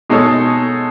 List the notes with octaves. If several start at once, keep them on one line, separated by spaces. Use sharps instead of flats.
B2 G#3 D#4 A4 C#5